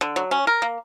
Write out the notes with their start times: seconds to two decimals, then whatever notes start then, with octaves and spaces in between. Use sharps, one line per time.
0.01 D3
0.16 F#3
0.31 C#4
0.47 A#4
0.62 A#3